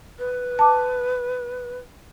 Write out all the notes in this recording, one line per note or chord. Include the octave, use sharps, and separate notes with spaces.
B4
A5 D6